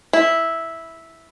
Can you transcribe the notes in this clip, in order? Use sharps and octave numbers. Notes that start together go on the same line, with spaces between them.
E4